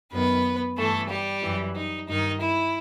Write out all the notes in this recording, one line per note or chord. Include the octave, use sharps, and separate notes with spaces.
F#2 D#3 B3 B4
G2 E3 A3 A4
G3 G4
F#2 E3
D#4
G2 D#3 D#4
E4